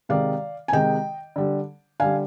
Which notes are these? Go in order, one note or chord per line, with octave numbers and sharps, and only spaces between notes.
C3 D#3 G#3 D5 F5
G#5
C3 D#3 G#3 D#5 G5
D3 G3
D3 G3 F5 G#5